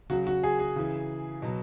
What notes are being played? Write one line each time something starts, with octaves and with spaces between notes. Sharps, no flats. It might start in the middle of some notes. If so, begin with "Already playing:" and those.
C#3 F#3 F#4
F#4
G#4
G#4
C#3 E3
B2 F#3